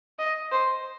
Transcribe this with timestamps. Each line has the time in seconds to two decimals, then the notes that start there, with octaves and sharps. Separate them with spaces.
0.19 D#5
0.52 C5